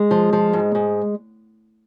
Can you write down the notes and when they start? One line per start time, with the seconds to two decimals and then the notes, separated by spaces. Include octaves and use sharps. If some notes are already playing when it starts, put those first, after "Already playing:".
Already playing: G#3
0.11 F3
0.33 F3
0.53 G#2
0.75 G#2